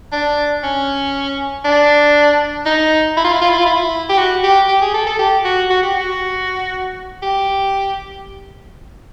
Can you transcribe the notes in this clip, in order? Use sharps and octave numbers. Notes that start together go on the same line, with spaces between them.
D4
C#4
D4
D#4
E4
F4
E4
F4
E4
F4
E4
G4
F#4
G4
G4
G#4
A4
A4
G4
F#4
F#4
G4
F#4
G4